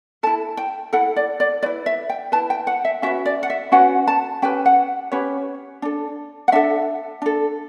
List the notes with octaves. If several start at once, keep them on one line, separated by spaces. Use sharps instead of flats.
E4 A4 A5
G5
E4 A4 F#5
D5
D5
E4 B4 D5
E5
G5
E4 B4 A5
G5
F#5
E5
C#4 F#4 B4 E5
D5
F#5
E5
C#4 F#4 B4 F#5
A5
C#4 G4 B4 G5
F#5
C#4 G4 B4 C#5
D4 A4
F#5
D4 A4 E5
D4 A4